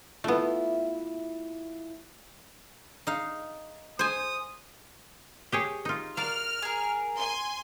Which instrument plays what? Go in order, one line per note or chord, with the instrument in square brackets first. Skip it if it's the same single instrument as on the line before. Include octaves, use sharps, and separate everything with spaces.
[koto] A3 B3 [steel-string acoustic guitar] E4 F4
[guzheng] D#4 F5
[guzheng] C5 G#5 [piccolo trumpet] D#6
[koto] G4 G#4 C#5
D#4 F4
[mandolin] F#4 A#4 [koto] D5 F5 [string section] F6
[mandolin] G#4 A#4
[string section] G#5 C6